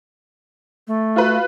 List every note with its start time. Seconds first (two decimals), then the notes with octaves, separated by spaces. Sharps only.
0.87 A3
1.16 F4 F#4 B4